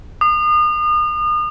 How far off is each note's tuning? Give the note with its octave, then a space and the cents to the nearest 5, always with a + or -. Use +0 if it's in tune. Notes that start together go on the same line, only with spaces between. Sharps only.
D#6 -35